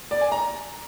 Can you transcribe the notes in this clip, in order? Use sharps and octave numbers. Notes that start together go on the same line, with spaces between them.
D5
G#5
A#5